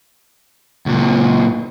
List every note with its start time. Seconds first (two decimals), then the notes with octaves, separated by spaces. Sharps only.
0.86 C#2 A#2